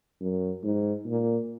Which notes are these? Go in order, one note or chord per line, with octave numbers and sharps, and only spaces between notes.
F#2
G#2
A#2